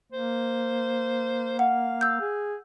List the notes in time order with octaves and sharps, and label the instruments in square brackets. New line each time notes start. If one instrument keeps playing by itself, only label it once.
[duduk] A#3 [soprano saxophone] C5
[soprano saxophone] F5 [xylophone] F#5
[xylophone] E6 G6
[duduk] G#4